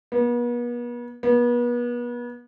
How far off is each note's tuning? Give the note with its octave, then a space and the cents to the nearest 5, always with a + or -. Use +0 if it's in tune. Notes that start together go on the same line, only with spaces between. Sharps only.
B3 -40
B3 -35